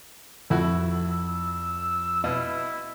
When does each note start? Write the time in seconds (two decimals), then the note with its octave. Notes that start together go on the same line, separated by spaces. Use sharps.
0.50 F2 A3 E4 F#4 E6
2.24 B2 E4